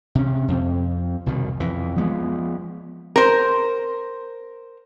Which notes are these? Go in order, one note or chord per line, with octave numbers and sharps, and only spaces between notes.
C3 C#4
F2 C4
C2 B2 D#3
F2 E3
F3 G#3 B3
A#4 C5